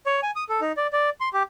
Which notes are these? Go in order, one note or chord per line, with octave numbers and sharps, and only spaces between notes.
C#5
G#5
D#6
A4
D#4
D5
D5
C6
G4